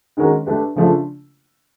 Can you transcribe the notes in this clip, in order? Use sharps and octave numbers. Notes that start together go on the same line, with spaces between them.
D#3 G#3 C#4 F#4 A#4
A3 D4 G4 B4
C#3 F3 A3 D4 F4